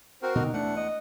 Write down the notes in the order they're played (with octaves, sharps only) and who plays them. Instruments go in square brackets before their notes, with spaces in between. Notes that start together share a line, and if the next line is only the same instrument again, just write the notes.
[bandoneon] C4 F#4 A#4 [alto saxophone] C5
[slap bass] B2 D3 [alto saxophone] D#4
[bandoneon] E2 F#5 [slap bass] A3 [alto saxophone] D4
[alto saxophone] D#5